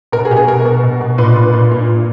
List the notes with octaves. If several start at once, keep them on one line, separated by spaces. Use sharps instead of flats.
B2 A#4
G#4
B2 G4
G#4
B2 A#4
B2
B2
B2
A#2 B4
A#2
A#2
A#2
A#2